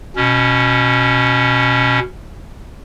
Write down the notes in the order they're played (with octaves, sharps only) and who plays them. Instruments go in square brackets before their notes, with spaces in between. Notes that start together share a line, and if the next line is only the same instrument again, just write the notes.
[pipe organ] B2 C#4